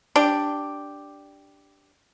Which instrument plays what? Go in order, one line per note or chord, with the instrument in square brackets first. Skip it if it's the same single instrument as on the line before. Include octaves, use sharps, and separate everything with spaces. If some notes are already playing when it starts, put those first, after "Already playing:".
[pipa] D4 G4